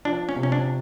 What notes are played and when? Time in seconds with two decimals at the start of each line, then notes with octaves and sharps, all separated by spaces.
0.05 F3 D4
0.29 C#4
0.36 C3
0.43 C#4
0.52 D4